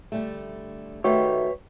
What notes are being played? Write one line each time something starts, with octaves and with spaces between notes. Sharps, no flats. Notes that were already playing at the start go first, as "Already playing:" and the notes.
D3 G3 A3
D#3 A3 F#4 G4 B4 C#5 E5 G5